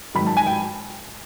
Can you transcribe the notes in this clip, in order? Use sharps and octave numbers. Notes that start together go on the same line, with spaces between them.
G#2 D#3 F#3 B5
A5
G#5
G5